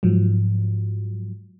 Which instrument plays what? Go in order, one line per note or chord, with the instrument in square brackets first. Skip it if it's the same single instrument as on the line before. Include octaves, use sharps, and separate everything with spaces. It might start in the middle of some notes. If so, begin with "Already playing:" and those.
[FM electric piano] G#2 F3 F#3